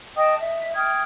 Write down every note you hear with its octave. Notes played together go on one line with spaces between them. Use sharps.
D#5 G5 A5 D#6
E5
G5 D#6 F6 G#6